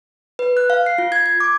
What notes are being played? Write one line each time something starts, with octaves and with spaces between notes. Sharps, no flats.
B4
F#6
F5
C7
F4
G#6
G#6
D6